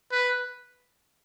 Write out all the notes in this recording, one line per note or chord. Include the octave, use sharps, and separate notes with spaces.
B4